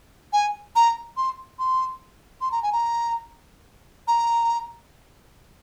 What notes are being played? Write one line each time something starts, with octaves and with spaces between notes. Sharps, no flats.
G#5
A#5
C6
C6
C6
A#5
G#5
A#5
A#5